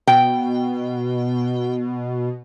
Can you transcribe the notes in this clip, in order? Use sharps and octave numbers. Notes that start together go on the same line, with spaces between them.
B2 G5